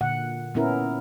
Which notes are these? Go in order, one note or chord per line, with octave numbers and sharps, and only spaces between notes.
A#2 D3 F#5
A#2 B3 C#4 E4 A#4